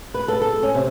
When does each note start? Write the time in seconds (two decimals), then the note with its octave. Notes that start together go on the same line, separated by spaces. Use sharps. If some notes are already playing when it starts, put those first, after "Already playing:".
0.14 B4
0.28 A4
0.41 A4
0.63 C#4
0.75 C3